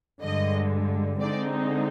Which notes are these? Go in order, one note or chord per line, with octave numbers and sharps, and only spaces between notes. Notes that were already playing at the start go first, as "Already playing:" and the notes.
G2 D3 G#3 D#5
D3 G#3 C4 D#4 D5